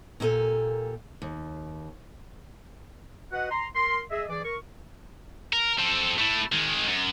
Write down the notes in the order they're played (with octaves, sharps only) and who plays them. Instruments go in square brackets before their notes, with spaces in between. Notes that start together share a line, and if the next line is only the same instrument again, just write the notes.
[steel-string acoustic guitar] A#2 A#3 D#4 G4 A4 G#5
D#2
[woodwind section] F#4 B4 D#5 F#5
A#5 C6
A#4 C6
G#4 D#5 E5
E3 G#4 D5
A#4 C#6
[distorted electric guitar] A#4
C4 A4
A3 E4
D#3 G#3
F#2